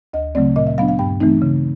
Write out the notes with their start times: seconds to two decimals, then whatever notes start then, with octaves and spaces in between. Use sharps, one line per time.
0.13 D2 D#5
0.35 C#3 F#3 A3 C4 D5
0.56 A#2 D#5
0.67 E5
0.78 F#3 B3 D4 F5
0.88 F5
0.99 G2 G5
1.20 E3 A3 C4 D#4
1.42 C#3